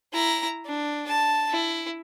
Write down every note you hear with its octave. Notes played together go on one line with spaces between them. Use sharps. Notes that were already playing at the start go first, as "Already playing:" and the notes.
E4 A#5
D4
A5
E4